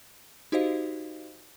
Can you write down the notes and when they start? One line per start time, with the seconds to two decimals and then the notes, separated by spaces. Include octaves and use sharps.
0.52 D#4 F#4 G4 C5 D#5 F5